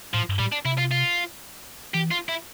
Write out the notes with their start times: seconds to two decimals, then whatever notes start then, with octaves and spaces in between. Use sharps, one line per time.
0.14 A2 F3
0.29 G2
0.39 A2 G3
0.52 D4
0.65 C3 E4
0.78 F4
0.91 F4
1.94 E3 G4
2.11 F4
2.29 E4